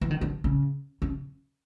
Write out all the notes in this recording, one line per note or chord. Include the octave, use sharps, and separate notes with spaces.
E3
D#3
D3
C#3
C#3